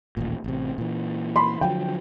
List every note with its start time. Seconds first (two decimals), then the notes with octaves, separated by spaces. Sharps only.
0.17 D#1 A1 A#2
0.44 A1 C3
0.78 A#2 E3
1.36 B5 C6
1.61 D3 F3 F#3 G5